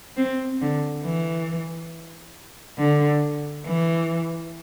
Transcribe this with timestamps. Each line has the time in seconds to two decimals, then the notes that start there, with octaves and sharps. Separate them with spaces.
0.17 C4
0.61 D3
1.04 E3
2.79 D3
3.66 E3